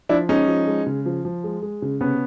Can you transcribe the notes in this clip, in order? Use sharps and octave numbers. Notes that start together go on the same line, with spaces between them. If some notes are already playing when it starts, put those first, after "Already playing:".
F3 D4 E4
G#3 C#4 D#4
F3
G#3
C#3
F3
F3
G#3
G#3
C#3
C3 B3 C#4